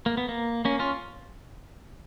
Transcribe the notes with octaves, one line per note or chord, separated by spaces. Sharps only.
A#3
B3
A#3
A#3 C#4
C#4 F4